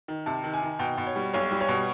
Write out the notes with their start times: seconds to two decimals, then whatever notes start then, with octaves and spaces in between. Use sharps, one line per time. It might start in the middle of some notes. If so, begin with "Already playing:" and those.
0.08 D#3
0.26 C3 A5
0.44 D#3
0.54 G#5
0.62 D#3
0.79 B2 G5
0.98 B2
1.07 C#5
1.16 G3
1.33 B1 C#5
1.51 G3
1.61 C#5
1.68 B2